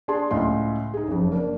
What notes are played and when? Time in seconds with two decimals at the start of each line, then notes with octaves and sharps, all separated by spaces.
0.08 D4 G#4 A5 C6
0.31 C#2 A2 D#5 C6
0.94 D#4 G#4
1.08 F#1 F2
1.32 A#3 D4